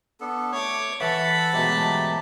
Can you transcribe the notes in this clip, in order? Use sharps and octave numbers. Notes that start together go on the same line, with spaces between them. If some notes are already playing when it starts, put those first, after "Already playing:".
B3 D4 A4
A3 C#5 D6
E3 A4 E5 F#5 A5 B5
G#2 B2 E3 F#3 A3 G4